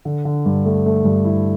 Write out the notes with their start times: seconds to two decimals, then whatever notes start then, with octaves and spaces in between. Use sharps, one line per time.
0.05 D3
0.25 D3
0.46 G2
0.65 A3
0.86 A3
1.05 G2
1.25 E4